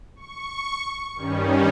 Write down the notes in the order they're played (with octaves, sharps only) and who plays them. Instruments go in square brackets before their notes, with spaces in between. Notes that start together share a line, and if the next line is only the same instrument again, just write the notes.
[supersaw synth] C#6
G2 D#3 G3 C#4